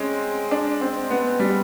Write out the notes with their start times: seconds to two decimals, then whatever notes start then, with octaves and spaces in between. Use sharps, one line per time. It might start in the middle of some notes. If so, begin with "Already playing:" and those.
Already playing: G#3 C4 C#4
0.51 D4
0.81 C4
1.10 B3
1.40 G3